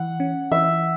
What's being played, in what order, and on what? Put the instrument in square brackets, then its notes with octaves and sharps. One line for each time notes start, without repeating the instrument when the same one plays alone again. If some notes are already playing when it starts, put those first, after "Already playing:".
Already playing: [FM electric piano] E3 [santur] F#5
[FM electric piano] C#4
[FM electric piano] E3 [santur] E5